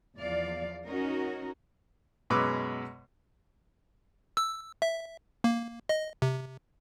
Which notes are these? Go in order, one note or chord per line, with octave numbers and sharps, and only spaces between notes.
E2 F3 D5 F5
C#4 D#4 F#4 A#4
F#2 B2 G#3 B4 D6 E6
E6
E5
A#3
D#5
C3